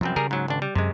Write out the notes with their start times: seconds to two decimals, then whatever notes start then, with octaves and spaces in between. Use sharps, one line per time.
0.01 C2 F#2 F3 C4
0.16 C#3 G3 G#4 A#4
0.31 G#2 F#3
0.48 G#1 D4
0.62 G3
0.75 F#2 C3 G#3